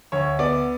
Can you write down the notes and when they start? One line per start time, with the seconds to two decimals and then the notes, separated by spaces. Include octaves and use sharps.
0.12 D2 C#5
0.39 B3 D5